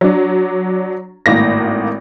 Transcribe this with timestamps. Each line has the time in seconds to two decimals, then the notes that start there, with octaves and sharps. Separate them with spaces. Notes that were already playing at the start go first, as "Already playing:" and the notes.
0.01 F#3 D4
1.26 G#1 A2 A#3 A#6